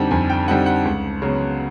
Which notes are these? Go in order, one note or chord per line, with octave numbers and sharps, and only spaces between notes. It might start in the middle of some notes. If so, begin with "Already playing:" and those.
Already playing: F2 D3 G3 C4 D#4 F#5
F2 G#5
G5
D3 G3 C4 D#4 F#5
F#5
C#2
C#3 F#3 B3